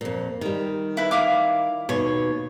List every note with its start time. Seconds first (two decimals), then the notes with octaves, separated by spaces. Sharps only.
0.01 F2 A#2
0.41 D#3 G3
0.97 E4 B4
1.11 E4 F5 D6
1.89 D#2 B2 C#5